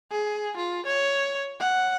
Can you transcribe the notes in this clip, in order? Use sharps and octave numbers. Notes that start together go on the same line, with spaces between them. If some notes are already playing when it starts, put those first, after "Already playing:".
G#4
F4
C#5
F#5